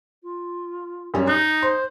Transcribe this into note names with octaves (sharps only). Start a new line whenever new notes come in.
F4
F#2 G3 C#4
D#4 F#6
C5 C6